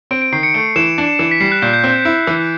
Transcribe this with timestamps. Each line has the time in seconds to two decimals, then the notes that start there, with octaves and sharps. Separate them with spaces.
0.11 C4 D7
0.22 D7
0.32 D#3 C7
0.43 C#7
0.54 A3 D7
0.76 E3 E7
0.98 D4
1.19 E3
1.31 B6
1.40 G3 C7
1.52 F#6
1.62 A#2 G6
1.73 G6
1.84 C4
2.05 E4
2.27 E3